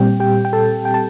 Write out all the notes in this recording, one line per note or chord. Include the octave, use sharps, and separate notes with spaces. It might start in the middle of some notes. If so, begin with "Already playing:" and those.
Already playing: A#2 G3 C4 G4 G5
G4 G5
G5
A4 A5
G5
A5